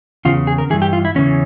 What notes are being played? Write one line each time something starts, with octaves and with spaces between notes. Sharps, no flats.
E2 C#3 F4
G#4
A#4
G2 E3 G#4
G4
F4
E4
E2 C#3 E3 C#4